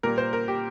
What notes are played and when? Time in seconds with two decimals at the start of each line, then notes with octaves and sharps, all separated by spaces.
0.03 A#2 G3 A#3 A#4
0.18 C5
0.33 A#4
0.48 G4